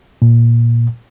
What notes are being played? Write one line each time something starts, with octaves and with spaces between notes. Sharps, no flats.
A#2